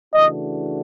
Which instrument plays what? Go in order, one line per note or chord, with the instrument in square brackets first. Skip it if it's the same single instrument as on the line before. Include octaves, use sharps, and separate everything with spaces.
[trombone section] C#3 E3 A3 D4 F#4 [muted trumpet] D#5